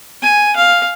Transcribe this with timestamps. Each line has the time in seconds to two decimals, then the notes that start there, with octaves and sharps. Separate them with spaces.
0.22 G#5
0.56 F5